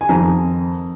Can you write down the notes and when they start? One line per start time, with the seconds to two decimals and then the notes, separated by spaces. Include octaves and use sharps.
0.01 G#5
0.09 F2 D#3 C4 A#5